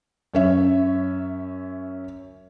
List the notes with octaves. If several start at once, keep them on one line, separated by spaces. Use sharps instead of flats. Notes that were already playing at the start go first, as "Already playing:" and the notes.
F#2 C#4 E5